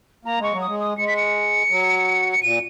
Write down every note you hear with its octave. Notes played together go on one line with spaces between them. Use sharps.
A#3 A#5
G#3 C#6
F#3
D#6
G#3
D#6
G#3 C#7
B6
C#7
F#3
C#7
A#2 D#7